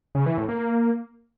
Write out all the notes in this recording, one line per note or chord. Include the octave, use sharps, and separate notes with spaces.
C#3
E3
A2
A#3